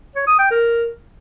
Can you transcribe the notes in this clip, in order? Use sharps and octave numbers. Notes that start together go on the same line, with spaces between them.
C#5
D#6
G5
A#4